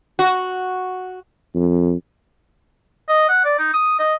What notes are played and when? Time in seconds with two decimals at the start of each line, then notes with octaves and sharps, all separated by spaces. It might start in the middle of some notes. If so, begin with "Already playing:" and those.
0.19 F#4
1.55 F2
3.09 D#5
3.29 F#5
3.45 D5
3.59 D#4
3.74 D#6
3.99 D#5